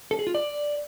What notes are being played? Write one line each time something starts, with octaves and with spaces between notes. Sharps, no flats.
A4
G#4
F4
D5